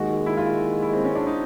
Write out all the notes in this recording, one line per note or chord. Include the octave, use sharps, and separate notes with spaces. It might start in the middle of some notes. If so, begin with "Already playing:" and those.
Already playing: D#2 D#3 G#3 F#4
E4
F4
E4
C4
C#4
D4
D#4